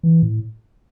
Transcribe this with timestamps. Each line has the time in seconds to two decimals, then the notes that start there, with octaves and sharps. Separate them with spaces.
0.03 E3
0.22 A2